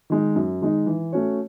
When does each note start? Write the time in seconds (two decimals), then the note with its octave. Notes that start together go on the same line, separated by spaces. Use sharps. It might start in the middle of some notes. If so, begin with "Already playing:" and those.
0.10 D#3 G#3 D#4
0.36 F#2
0.61 D#3 G#3 D#4
0.86 E3
1.13 A3 C#4 F#4 C#5